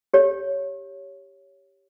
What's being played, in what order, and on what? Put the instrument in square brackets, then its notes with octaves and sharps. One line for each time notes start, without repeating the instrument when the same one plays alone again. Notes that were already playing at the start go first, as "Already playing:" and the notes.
[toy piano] G4 C#5